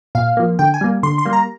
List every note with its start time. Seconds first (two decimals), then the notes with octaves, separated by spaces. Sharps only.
0.15 A#2 F5
0.37 F3 A#3
0.59 D3 G5
0.74 G#5
0.81 G3 A#3
1.03 D3 C6
1.18 C6
1.25 G3 A#3
1.33 A#5